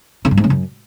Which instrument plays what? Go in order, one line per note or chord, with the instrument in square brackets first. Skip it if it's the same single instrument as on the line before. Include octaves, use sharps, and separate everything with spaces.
[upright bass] C#3
G2
G#2
C#3
F#2